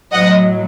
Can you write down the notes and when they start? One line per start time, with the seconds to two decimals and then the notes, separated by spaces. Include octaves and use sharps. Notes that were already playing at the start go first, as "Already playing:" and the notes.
0.12 A2 F#3 D#5 F#5